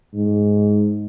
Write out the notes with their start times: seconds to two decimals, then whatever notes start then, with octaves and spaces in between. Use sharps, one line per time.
0.14 G#2